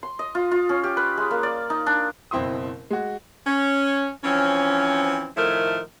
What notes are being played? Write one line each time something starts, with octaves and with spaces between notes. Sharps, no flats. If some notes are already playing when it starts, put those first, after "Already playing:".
C6
D#5
F4
F4
C#4
G4
B4
G#3
A#3
D5
D#4
D4
F#1 B2 C4 E4 C6 D#6
G#3 F#4
C#4
E3 F3 C4 C#4
A2 D#3 F3 A3 E4 A#4